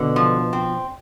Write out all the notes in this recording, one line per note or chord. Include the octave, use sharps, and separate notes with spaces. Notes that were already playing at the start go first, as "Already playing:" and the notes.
Already playing: B2 D3
F3
C4